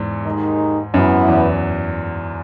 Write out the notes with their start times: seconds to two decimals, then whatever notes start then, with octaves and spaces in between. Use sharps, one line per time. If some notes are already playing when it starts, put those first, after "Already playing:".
Already playing: E2 G#2
0.25 D#2 D#3 G#3 D#4
0.94 F#2 E3 B3 E4
1.28 E2